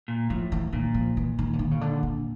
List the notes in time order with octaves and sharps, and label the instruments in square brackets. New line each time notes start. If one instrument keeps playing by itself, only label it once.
[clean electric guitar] A#2
[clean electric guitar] A2 [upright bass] F3
[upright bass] E3
[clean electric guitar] A#2 [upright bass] D#3
[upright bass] F3
E3
D#3
D3
D#3
C#3
D3
D3